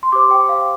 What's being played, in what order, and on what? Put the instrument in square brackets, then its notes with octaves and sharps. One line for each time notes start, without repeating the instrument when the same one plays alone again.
[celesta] C6
G4 C5 D6
G5
F5